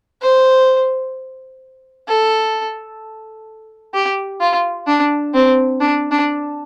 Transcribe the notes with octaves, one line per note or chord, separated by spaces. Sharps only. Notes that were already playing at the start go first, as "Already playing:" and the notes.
C5
A4
G4
F4
D4
C4
D4
D4